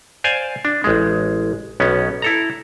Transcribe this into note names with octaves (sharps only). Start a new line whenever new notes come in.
C5 D5 F5 G#5
D4
A1 G#3
B1 B3 C#4
E4 A4 A#5